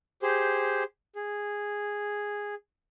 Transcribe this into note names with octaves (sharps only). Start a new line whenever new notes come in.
G4 G#4 C5
G#4